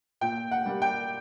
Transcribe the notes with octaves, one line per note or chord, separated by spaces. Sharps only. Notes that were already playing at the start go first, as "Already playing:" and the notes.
A#2 G5
F#5
G3 A#3
G5